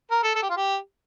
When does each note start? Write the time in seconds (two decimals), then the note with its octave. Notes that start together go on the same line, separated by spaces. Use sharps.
0.11 A#4
0.23 A4
0.36 A4
0.42 G4
0.50 F4
0.57 G4